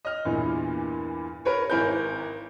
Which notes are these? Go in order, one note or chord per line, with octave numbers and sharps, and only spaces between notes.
D#5 F6
E2 G2 A#2 E3
A#4 B4 C#5
G#1 E4 A#4 G#5 G6